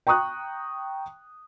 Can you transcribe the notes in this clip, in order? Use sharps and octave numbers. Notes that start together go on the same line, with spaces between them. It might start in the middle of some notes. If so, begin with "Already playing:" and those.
G5 A#5 C#6 D#6 F#6